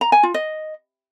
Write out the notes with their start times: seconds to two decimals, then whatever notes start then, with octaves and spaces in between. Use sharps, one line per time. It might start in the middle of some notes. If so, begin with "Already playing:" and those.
0.01 A#5
0.12 G#5
0.23 F4
0.34 D#5